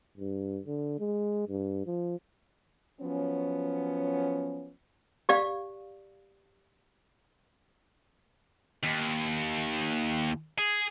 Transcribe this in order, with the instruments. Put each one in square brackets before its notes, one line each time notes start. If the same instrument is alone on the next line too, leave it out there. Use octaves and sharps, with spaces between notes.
[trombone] G2
D3
G#3
G2
F3
[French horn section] F3 F#3 B3 C#4
[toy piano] G4 D5 F5
[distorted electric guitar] D#2
G#4